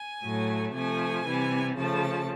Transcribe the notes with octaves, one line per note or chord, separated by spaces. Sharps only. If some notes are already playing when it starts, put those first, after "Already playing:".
Already playing: G#5
A2 F#3 A3
C3 F3 A3 G#5
C3 E3 G3
C#3 F3 A3 A5